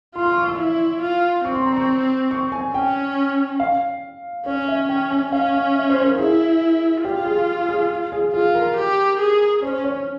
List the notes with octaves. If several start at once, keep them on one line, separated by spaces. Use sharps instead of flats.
F4 C6
C6
C#6
E6
E4
F4
C4 C#6
C6
A#5
C#6
C#6
G#5
C#4 G5
F5
C#4 C#5
E5
C#4 G5
G#5
C#4 F5
F5
E5
C5
A#4
E4 G#4
F4 G4
G#4
G#4
G#4
F4 G#4
A#4
G4
G#4
C#4 C5
C#5